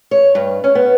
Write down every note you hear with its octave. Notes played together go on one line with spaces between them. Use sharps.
C#5
G2
C#4
B3